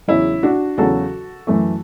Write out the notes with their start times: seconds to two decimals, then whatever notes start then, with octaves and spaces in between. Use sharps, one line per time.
0.08 E2 C#3 F#3 C#4 E4
0.43 D4 F#4
0.78 E2 C#3 F#3 F#4 A4
1.47 F#2 E3 A3